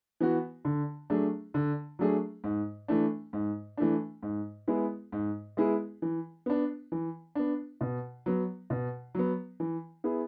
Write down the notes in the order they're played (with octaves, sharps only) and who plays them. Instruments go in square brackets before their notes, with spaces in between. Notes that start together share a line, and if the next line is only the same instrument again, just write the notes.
[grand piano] E3 B3 F#4
D3
F#3 A3 D4 G#4
D3
F#3 A3 D4 G#4
G#2
E3 A3 D4
G#2
E3 A3 D4
G#2
G#3 B3 E4 G#4
G#2
G#3 B3 E4 G#4
E3
B3 D4
E3
B3 D4
B2
F#3 B3
B2
F#3 B3
E3
B3 E4 G#4